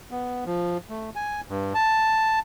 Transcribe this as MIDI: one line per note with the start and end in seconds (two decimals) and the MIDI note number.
0.11 0.44 59
0.46 0.78 53
0.89 1.10 57
1.16 1.41 80
1.49 1.73 43
1.74 2.39 81